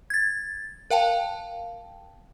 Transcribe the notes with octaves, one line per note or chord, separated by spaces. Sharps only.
G#6 A6
A#4 F5 G5 A5